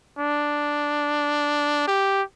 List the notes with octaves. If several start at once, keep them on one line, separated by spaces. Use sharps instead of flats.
D4
G4